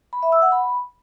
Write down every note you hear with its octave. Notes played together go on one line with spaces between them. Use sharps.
B5
E5
E6
F#5
B5